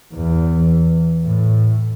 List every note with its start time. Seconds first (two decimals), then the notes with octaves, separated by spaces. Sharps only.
0.14 E2
1.25 A2